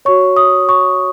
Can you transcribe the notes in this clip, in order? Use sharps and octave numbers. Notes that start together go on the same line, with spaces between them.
F#4 C#5 C#6
D#6
C#6